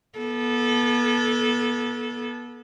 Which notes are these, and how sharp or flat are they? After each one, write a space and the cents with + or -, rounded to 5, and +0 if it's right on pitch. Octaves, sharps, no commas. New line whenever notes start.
B3 -35 A4 -20